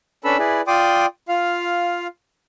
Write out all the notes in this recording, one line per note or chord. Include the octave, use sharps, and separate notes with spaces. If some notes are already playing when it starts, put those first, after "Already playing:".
C#4 D4 A4 B4 B5 E6
E4 G#4 B4 D5
F4 D5 G5 C6 D6 D#6
F4 F5